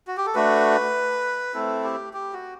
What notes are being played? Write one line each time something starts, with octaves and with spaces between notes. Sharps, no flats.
F#4
G4
A4
A3 D4 F#4 B4
A3 C4 E4 A4
G4
G4
F#4